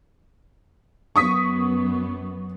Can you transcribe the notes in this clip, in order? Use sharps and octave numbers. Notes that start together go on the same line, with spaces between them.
F#2 B3 C#6 D#6 B6